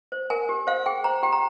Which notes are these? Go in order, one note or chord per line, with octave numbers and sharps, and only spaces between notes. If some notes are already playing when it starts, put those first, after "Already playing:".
C5
A#4 G#5
G4
C5 F5
G#4 G5
C5 A#5
G4 G5
A#5